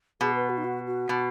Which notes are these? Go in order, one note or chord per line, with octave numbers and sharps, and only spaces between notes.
B2 G#4
B4
F#4
D#4
F#4
F#4
B2